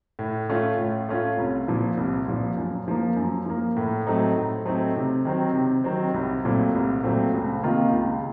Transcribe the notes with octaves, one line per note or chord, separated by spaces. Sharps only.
A2
A3 C#4 F4
A2
A3 C#4 F4
C2
A#2 F3
C2
A#2 F3
F#2
F3 A#3
F#2
F3 A#3
A2
F#3 A3 C4 D#4
A2
F#3 A3 C4 D#4
C3
D#3 F#3 C4
C3
D#3 F#3 C4
C2
A#2 F#3 A3 C4
C2
A#2 F#3 A3 C4
C#2
C3 D#3 A#3 F4
C#2